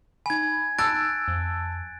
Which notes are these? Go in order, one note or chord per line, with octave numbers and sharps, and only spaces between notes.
D#4 G#5 B5 G#6
A5 E6 F#6 A6 D7
F2